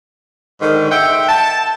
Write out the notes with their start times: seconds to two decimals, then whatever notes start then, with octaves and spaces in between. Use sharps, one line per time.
0.61 G#2 D3 D#3
0.91 E5 F#5 G5
1.28 A5